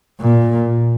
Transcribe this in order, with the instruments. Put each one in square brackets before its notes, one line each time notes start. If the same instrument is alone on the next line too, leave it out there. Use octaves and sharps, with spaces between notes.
[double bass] A#2